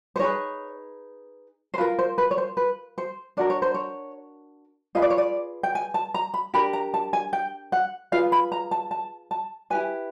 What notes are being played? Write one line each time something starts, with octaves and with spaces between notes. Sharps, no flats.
C5
D#4 G#4 B4 C#5
C5
F4 A#4 B4
C5
B4
C#5
C5
B4
C5
D4 F#4 A#4 D5
C#5
C5
C#5
F4 G#4 B4 D#5
D5
C#5
D5
G5
G#5
A5
A#5
B5
D4 G4 A#4 B5
A#5
A5
G#5
G5
F#5
F4 G#4 B4 F5
B5
A#5
A5
A5
A5
E4 G4 B4 G#5